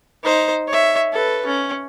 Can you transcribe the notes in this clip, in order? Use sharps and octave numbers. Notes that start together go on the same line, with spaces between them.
D#4 C5
C#5 E5
A4 B4
C#4